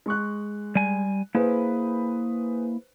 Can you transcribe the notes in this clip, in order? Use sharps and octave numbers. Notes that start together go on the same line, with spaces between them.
G#3 C#6 F#6
G3 G#5
A#3 E4 G#4 B4 C5